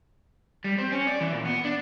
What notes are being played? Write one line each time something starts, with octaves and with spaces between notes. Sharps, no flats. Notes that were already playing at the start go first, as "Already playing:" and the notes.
G3
C4
C#4
D5
E3
A#2
B3
D4